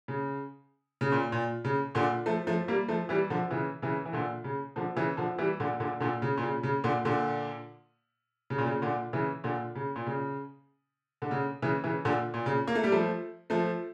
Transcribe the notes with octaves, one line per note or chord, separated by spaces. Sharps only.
C#3
C#3
A#2
A#2
C#3
A#2 D3
F3 A3
F3 A3
G3 A#3
F3 A3
E3 G3
D3 F3
C#3 E3
C#3 E3
E3
A#2 D3
C#3
D3 F3
C#3 E3
D3 F3
E3 G3
A#2 D3
A#2 D3
A#2 D3
C#3
A#2
C#3
C#3
A#2 D3
A#2 D3
C#3
A#2
C#3
A#2 D3
C#3 E3
A#2 D3
C#3
A#2
C#3
D3
C#3
C#3 E3
C#3 E3
A#2 D3
A#2
C#3
A#3
A3
G3
F3 A3
F3 A3